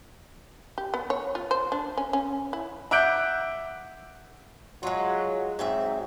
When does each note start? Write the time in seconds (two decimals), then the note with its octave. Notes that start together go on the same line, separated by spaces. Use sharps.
0.78 G4
0.94 B3
1.10 C#5
1.35 F4
1.51 C5
1.72 D4
1.97 C#4
2.13 C#4
2.53 E4
2.91 E5 F#5 D6 F#6 G6 D7
4.83 F#3 G#3 F4
5.59 G#2 F#3 C4 E5